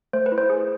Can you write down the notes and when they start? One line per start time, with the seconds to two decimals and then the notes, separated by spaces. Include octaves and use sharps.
0.13 A3 C5
0.26 B4
0.32 E4
0.38 C5
0.50 G#4